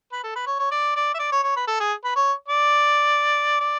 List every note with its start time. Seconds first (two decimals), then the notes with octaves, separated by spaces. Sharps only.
0.12 B4
0.23 A4
0.35 B4
0.47 C#5
0.59 C#5
0.71 D5
0.96 D5
1.14 E5
1.19 D5
1.32 C#5
1.44 C#5
1.56 B4
1.68 A4
1.80 G#4
2.04 B4
2.16 C#5
2.48 D5
3.61 D5